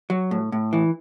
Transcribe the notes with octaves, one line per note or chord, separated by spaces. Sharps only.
F#3
A2
A2
E3